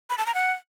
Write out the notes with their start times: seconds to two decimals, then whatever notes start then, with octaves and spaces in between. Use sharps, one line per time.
0.10 B5
0.18 A5
0.26 A#5
0.35 F#5